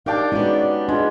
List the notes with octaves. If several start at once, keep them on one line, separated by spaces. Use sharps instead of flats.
D4 D#4 G4 A#4 D5 F5 G5
G#3 B3 C#4 D#4 F#4 D5
G#3 D4 F4